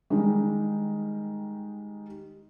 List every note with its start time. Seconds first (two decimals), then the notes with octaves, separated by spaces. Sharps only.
0.10 D#3 G3 G#3